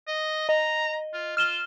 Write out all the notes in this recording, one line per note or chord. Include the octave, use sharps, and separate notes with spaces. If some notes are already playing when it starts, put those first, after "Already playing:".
D#5
D#5 A#5
F4
F4 F6 E7 G7